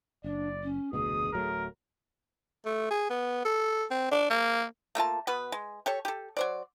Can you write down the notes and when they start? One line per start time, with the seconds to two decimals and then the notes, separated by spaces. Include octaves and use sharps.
0.24 F#1 D4 D5
0.63 C#4
0.93 F1 D2 B2 G#4 D#6
1.33 D1 F#3 A3 A#4
2.66 A3
2.91 G#4
3.10 B3
3.45 A4
3.91 C4
4.12 D4
4.30 A#3
4.95 A3 A#3 F4 A5
5.27 B2 B3 B4
5.52 G#3
5.86 G4 A4 C#5
6.05 G4 A4
6.37 F#3 C5 D5